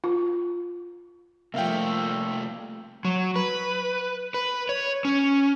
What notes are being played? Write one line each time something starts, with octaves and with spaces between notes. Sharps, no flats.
F4
C2 F3 A3 A#3 E5 F5 G5
F#3
B4
B4
C#5
C#4